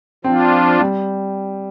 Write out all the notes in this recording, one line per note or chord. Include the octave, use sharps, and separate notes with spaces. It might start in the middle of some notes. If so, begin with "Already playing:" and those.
F3 C4 D4 F4
G3